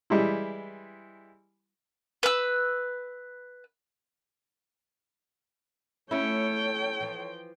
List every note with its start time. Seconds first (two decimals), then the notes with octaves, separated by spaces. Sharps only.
0.10 E3 G3 G#3 E4
2.23 B4 E6
6.11 A3 C#4 E4 A4 C#5 G5
7.00 E3 F3